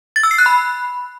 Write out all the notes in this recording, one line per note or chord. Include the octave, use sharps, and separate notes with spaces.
A6
E6
C7
F#6
B5